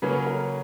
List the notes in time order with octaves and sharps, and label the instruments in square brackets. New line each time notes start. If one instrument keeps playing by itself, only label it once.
[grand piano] C#3 F#3 A#3 C#4 [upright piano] B4
[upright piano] A#4